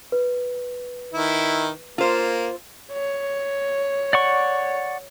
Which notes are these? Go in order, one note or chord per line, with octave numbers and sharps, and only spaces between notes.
B4
D#3 E4
A#3 F4 C5
C#5
D5 F#5 C#6